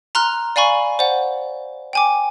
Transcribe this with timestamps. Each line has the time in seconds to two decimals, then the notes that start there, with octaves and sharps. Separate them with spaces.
0.15 A#5 C6 F6 F#6 F7
0.56 D5 F5 G#5 B5 C#6
0.99 C5 D5 F#5
1.93 G5 G#5 D6